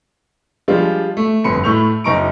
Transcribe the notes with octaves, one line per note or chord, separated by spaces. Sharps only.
F3 G3 G#3 D4 F4
A3
G1 F2 B5 C6 C#7
A2 A3 B5 C#6 G6 F7
F#1 D#4 A#5 C#6 D7